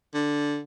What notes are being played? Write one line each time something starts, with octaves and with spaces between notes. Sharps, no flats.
D3